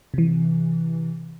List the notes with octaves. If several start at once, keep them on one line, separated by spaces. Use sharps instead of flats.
C3 E3